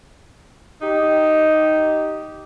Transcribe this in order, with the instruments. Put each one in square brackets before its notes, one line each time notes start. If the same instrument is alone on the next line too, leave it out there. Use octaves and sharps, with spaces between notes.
[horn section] D#4 G4